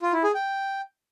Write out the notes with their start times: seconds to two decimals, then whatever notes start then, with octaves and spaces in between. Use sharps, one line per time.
0.02 F4
0.13 E4
0.24 G#4
0.34 G5